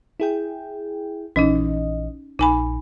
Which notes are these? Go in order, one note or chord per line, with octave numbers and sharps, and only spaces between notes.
E4 G#4 G5
A#1 E3 C#4 D#4 D#5
A#1 D#4 G#5 B5